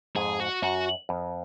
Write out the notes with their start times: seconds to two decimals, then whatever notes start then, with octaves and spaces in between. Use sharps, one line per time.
0.16 F2 G#2 G#4
0.40 F#4
0.62 F#2 F#4
1.09 F2